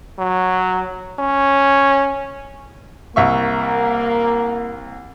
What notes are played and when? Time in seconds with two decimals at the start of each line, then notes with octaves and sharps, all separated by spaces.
0.18 F#3
1.19 C#4
3.16 C2 A#3 E5 C#6